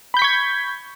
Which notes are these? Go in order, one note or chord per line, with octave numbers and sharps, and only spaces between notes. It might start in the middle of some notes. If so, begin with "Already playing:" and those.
B5 C#6 G6 G#6 B6